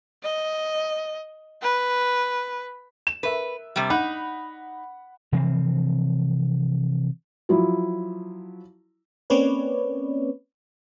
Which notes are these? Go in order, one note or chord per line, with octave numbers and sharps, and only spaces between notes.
D#5
B4
E7
A#4 B4 E5
C3 G3
D#4 F#5 B5 F#6
C3 E3 F3 C4
F3 F#3 E4
A#3 C4 C#4 B4 C#5 D5